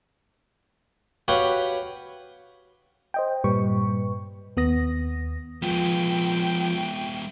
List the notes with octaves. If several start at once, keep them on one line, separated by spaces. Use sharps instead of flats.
F#4 G4 B4 C#5 F5 G5
C5 D#5 G5
G2 A#2 G3 B4 C#6
D#2 B3 D#6 A#6
F3 G#3 B3 G5